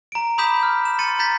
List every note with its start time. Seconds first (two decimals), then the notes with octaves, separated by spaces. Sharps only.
0.12 A#5 D7
0.38 B5 D6 D#6 G6 B6 E7
0.63 F6
0.85 E7
0.99 C6 A6 C#7 D#7
1.19 A#5 C6 G6 A6 B6